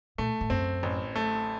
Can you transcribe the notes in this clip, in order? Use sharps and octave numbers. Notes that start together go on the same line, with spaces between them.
A#2 A3
A2
F#2 C4
A1
A3